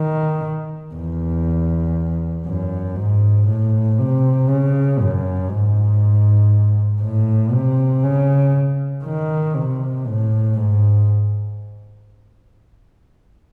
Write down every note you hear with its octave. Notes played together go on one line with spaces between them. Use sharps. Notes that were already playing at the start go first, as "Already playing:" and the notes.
Already playing: D#3
E2
F#2
G#2
A2
C3
C#3
F#2
G#2
A2
C3
C#3
D#3
C3
A2
G#2